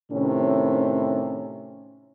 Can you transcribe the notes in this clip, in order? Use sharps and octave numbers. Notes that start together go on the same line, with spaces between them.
A2 C3 D#3 C#4